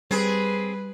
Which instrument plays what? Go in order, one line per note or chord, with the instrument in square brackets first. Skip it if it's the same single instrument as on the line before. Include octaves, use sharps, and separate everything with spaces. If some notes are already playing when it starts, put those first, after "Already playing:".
[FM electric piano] G3 [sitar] C4 G#4 [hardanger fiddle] B4